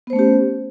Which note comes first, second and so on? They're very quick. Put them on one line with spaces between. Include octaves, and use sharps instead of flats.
B3 C5 A3 C#4 G4